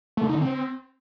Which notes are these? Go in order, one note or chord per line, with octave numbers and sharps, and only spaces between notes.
A3
D3
D#4
D3
C4